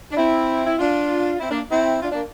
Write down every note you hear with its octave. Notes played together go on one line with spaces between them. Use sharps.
D4
C4 E4
E4
D4 F4
C4 E4
A#3 D4
C4 E4
D4 F4
A#3 D4